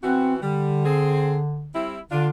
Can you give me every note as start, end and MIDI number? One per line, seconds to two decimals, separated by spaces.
0.03 0.38 52
0.03 0.38 59
0.03 0.34 60
0.03 0.38 66
0.42 1.79 50
0.42 0.83 55
0.85 1.39 60
0.85 1.39 68
1.74 1.99 55
1.74 1.99 60
1.74 1.99 64
2.11 2.30 50
2.11 2.28 62
2.11 2.28 65